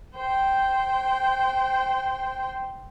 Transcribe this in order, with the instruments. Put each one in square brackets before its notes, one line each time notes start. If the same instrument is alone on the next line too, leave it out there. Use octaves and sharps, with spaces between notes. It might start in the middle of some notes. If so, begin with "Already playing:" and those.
[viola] C5 G5